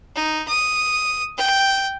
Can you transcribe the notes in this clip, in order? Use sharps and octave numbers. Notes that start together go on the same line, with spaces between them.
D#4
D#6
G5